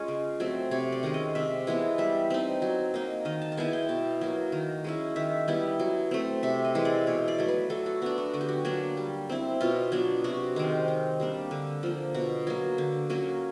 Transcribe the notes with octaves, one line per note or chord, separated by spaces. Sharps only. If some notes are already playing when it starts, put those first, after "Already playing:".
Already playing: G#3 C#4 F4
C#3
F#3 A3 C4
C3 C#5
D5
D#3 G#3 C#4
D#5
C3 E5
E3 G#3 B3
G3 E5
C4 D#4
F#3
A#3 D#4
D#3 D#5
A5
A5
G#3 B3 E4 G#5
G5
B2 A5
F#3 A#3
D#3
G#3 C#4 E4
D#3 E5
G3 B3 E4
F#3
A3 C4
C3 E5
D#5
E3 G#3
D5
B2 C#5
D5
F#3 A3
B4
F#3 A4
F#4
B3 D4 F#4
F#4
D3 F#4
G4
F#4
F#3 A#3 D4
G3
C4 E4
B2 F4
F#3 B3 D4
C3 F#4
D#3 G#3 C4
D#3
G3 A#3 D4
D3
F3 A#3
B2 F#4
F#3 A#3
D3
F#3 A#3 C#4